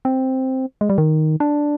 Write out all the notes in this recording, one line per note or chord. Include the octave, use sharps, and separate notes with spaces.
C4
G#3
G3
D#3
D4